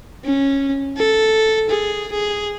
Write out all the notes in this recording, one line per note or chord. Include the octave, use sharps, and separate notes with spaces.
C#4
A4
G#4
G#4